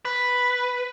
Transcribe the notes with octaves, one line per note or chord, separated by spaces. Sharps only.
B4